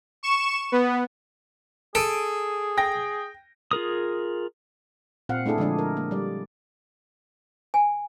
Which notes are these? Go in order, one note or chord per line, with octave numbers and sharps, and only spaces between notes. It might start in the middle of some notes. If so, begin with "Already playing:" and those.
C#6 E7
B3
G#4 A4 D7 D#7
G5 A#6
F4 G#4 A#4 D#6
A#2 C4 F5 F#5
A3 D4 E4 G#4 A4
D3 F3 G#3 D4 G#4
A#4
A#3
G3 D5
G#5